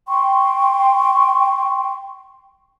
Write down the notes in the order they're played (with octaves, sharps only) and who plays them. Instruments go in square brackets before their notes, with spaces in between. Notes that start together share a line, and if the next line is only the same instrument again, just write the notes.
[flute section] G5 C6 C#6